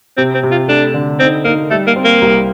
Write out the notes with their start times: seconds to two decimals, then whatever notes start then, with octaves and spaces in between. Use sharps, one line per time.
0.17 C3 C4
0.35 C4
0.43 C3
0.52 F4
0.68 A3 D4
0.94 D3
1.20 C4 D#4
1.45 A#3 D#4
1.71 G3 A3
1.87 A#3
1.96 C4
2.05 A#3
2.22 C2